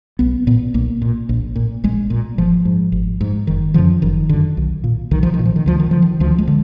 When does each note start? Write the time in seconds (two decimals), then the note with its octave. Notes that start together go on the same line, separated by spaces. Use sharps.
0.19 B1 B3
0.47 A#2 B3
0.74 B1 A#3
1.02 A#2
1.29 A#1
1.56 A#2
1.84 A#1 G#3
2.10 A#2
2.38 G#1 F3
2.65 G#2
2.92 G#1
3.21 G#2
3.47 F#1 D#3
3.74 F#2 D3 F3
4.02 F#1 D#3
4.29 F#2 D3
4.57 B1
4.84 A#2
5.11 B1 D#3
5.23 F3
5.34 D#3
5.39 A#2
5.45 F3
5.56 D#3
5.66 D2 F3
5.80 D#3
5.91 D3 F3
6.02 D#3
6.20 D2 F3
6.38 G#3
6.47 D3